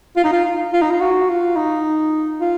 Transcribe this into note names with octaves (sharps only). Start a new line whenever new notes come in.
F4
D#4
F4
F4
D#4
F4
F#4
F4
D#4
F4